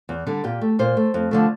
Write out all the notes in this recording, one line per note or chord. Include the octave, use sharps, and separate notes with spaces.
E2
D3 G3
A#2 G4
A3
A#2 C5
A3
F2
D3 F3 A3